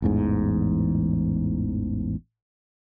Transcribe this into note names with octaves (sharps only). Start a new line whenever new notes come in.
A1 E2 G#2